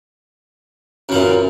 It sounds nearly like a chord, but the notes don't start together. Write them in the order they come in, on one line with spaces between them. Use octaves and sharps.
F#2 E3 A#2